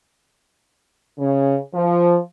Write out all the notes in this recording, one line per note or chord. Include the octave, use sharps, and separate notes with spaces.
C#3
F3